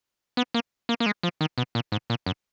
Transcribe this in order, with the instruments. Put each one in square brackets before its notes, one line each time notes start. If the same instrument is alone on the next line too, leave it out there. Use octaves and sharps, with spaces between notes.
[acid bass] B3
A#3
A#3
A#3
G#3
F3
D#3
B2
A#2
G#2
A#2
F#2